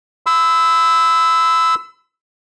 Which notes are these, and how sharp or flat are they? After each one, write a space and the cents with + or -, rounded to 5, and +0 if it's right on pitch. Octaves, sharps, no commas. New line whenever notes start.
B5 +40 E6 -10